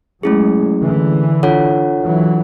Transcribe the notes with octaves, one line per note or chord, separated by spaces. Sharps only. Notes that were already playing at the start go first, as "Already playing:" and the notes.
F#3 G#3 A3 C#4 E4 G#4
D3 E3
D4 F4 A4 C#5 F#5
E3 F#3